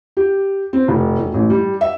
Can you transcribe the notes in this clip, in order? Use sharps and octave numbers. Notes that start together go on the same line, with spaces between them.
G4
C4
F1
E1
A1
G3
E5